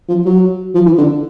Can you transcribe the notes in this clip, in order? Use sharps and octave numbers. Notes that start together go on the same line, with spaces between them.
F3
F#3
F3
E3
D3